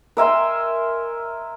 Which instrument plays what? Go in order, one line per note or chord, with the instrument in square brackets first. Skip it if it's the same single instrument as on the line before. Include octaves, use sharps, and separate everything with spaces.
[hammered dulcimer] A#4 E5 G#5 C6